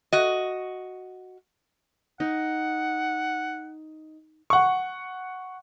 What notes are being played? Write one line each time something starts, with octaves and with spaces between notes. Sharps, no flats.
F#4 D#5
D#4 F#5
F#5 C#6